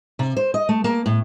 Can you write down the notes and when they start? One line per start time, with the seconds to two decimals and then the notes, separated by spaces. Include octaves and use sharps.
0.19 C3
0.37 C5
0.54 D#5
0.69 A3
0.84 A#3
1.06 A2